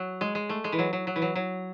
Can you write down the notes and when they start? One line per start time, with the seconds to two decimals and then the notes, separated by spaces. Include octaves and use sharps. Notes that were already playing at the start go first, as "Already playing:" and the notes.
Already playing: F#3
0.21 G#3
0.35 G#3
0.49 A3
0.64 G#3
0.72 E3
0.79 F#3
0.93 F#3
1.07 F#3
1.16 E3
1.22 F#3
1.36 F#3